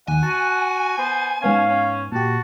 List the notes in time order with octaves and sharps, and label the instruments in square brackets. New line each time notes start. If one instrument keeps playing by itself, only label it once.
[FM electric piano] D#2 [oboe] F#5 [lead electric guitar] G#5
[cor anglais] F#4 [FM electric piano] A5
[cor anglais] B3 [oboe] C5
[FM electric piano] G#2 B3 G#6 [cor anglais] C#4 [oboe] F5
[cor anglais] C#4
[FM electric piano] A#2 G4 [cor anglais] F#4 [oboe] A5